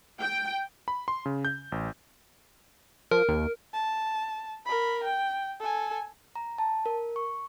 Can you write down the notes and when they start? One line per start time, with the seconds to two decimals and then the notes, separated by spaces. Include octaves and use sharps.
0.21 G5
0.88 B5
1.08 C6
1.26 C#3
1.45 G6
1.72 A1
3.11 F3 A#4
3.28 D#2
3.73 A5
4.65 A#4 B5
5.04 G5
5.60 A4 G#5
6.35 A#5
6.58 A5
6.86 A#4
7.16 C#6